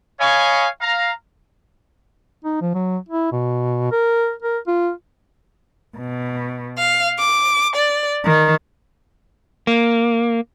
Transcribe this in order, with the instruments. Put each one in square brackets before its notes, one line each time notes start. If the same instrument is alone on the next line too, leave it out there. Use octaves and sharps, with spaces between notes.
[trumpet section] C#5 D#5 F5 G#5 B5 C#6
F5 A#5
[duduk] D#4
F3
F#3
E4
B2
A#4
A#4
F4
[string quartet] B2
F5
D6
D5
D#3
[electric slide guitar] A#3